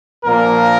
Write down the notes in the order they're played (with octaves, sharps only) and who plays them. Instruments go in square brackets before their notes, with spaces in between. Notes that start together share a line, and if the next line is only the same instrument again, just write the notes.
[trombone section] A#1 A#2 F3 A#3 A#4